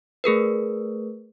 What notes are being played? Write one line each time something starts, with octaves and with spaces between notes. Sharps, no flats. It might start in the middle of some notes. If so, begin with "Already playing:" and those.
A3 G#4 A#4 B4